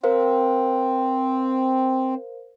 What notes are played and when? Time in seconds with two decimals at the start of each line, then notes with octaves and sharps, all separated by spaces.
0.03 C4 A#4 C5 F5